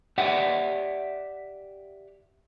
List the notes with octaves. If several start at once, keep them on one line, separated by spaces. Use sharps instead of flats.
G4 D5 E5 F#5